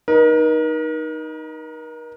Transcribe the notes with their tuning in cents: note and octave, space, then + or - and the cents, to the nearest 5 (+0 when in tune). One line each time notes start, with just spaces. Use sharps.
D#4 +0 A#4 +40